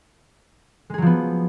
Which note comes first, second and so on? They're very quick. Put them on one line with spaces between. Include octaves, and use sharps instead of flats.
G#3 G#4 F#3 F3 B3